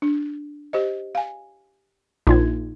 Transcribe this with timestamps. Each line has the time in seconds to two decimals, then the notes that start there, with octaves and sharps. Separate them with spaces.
0.02 D4
0.73 G4 C5 D#5
1.15 F5 G#5
2.27 A#1 A#2 D#4 F4 G#6